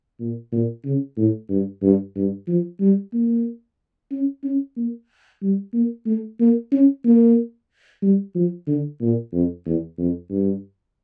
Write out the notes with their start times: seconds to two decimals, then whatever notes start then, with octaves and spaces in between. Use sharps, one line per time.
0.20 A#2
0.52 A#2
0.85 C#3
1.17 A2
1.49 G2
1.82 G2
2.16 G2
2.48 F3
2.80 G3
3.14 A#3
4.11 C#4
4.44 C#4
4.77 A#3
5.42 G3
5.74 A#3
6.06 A3
6.40 A#3
6.72 C#4
7.05 A#3
8.02 G3
8.35 F3
8.67 D3
9.01 A#2
9.32 F2
9.66 E2
9.98 F2
10.30 G2